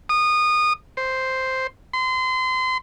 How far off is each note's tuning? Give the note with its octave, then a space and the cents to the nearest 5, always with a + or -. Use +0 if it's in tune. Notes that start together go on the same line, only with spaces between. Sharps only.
D#6 -20
C5 +0
C6 -30